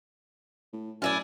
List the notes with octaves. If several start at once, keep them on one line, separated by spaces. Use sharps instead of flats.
A2
F#2 D4 E4 F4 G#5